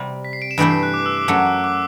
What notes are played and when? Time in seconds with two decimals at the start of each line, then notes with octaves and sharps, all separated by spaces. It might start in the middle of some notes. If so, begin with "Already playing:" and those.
Already playing: C3 G3 C4
0.25 B6
0.33 C7
0.42 D7
0.51 E7
0.58 G2 E3 A3 E4 G4 D7
0.71 C7
0.83 F#6
0.94 D6
1.06 E6
1.18 D6
1.28 F#2 F#3 A3 E6
1.64 D6